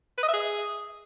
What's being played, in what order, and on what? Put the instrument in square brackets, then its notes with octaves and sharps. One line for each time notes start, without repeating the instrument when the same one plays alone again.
[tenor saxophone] B4
D#5
E5
G#4